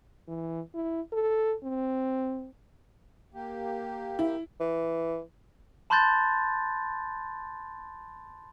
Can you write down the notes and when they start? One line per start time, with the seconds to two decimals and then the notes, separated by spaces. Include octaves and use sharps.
0.28 E3
0.74 E4
1.12 A4
1.63 C4
3.34 A#3 G4
4.19 E4
4.60 E3
5.90 A5 B5 C6 F#6 G6 A6